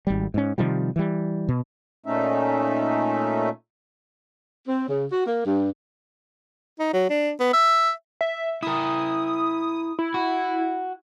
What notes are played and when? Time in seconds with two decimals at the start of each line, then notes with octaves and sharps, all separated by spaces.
0.07 G#1 G3
0.34 G#2 C#4
0.58 C3 D#3 F3 G3
0.96 E3 G3
1.49 B2
2.06 A#2 A3 C#4 D#4 E5
4.67 C4
4.88 C#3
5.11 F#4
5.26 A#3
5.45 G2
6.80 D#4
6.93 F#3
7.09 D4
7.40 B3
7.53 E5
8.21 E5
8.63 E4 A#4 D#6
9.99 E4
10.14 F#4